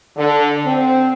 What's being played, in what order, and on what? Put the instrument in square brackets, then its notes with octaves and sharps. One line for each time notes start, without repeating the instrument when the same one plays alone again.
[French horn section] D3
C4